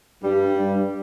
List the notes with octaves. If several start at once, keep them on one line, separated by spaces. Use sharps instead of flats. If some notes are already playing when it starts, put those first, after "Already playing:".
G2 G3
G2